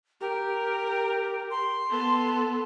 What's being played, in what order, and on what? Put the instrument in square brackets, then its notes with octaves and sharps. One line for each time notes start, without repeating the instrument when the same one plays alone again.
[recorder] G4 [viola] A#4
[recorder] C6
[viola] B3 A4